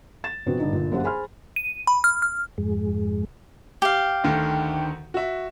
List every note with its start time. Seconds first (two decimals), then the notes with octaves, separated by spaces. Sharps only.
0.24 A6 E7
0.46 A#1 C3 B3 C4 F#4
0.59 G2 D3 D#4
0.72 G1 A#2
0.92 F#2 A#3 G4 C5 F#5
1.04 G#4 C5 G#5 B5 C6 F6
1.56 D#7
1.87 B5
2.04 F6
2.22 F6
2.58 F2 G#2 G#3
3.82 G4 F5
4.24 D2 D3 D#3
5.14 F#4 E5